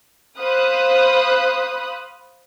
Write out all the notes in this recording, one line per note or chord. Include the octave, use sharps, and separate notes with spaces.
C5 F5 B5 D#6 F#6